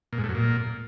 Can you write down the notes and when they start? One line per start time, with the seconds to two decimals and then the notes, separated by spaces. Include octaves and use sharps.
0.13 A#2
0.18 G#2
0.24 A2
0.29 F#2
0.35 A#2